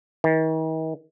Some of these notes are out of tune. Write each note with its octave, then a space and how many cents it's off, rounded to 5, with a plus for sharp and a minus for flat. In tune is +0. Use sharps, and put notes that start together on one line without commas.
D#3 +45